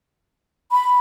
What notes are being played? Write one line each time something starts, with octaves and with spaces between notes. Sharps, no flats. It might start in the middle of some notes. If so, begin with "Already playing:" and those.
B5